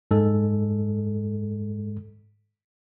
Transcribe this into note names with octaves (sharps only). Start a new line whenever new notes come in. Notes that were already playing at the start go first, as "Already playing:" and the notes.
G#2 G#3 A4